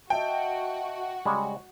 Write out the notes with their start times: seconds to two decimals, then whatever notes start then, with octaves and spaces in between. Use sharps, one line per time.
0.10 F#4 D#5 E5 G5 A5
1.26 C#3 G3 G#3